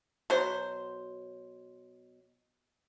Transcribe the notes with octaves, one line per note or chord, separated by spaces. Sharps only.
B2 F#3 C5